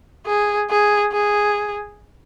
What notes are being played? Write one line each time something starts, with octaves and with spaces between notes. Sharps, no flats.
G#4
G#4
G#4